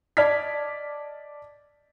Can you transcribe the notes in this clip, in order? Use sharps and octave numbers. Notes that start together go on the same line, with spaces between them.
D5 D#5 A5 F6 G#6 B6